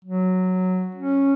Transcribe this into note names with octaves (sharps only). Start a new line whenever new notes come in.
F#3
C#4